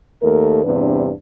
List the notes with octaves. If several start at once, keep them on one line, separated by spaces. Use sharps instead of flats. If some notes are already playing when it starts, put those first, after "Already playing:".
D#2 A3 A4 A#4
E2 G2 C3 D4 B4